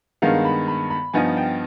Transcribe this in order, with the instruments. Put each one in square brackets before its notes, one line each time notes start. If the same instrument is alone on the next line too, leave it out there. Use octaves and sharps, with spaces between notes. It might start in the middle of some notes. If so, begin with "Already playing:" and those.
[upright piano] G2 D#3 G#3 B3 F5
B5
B5
B5
G2 F3 B3 D#4 G#5
G5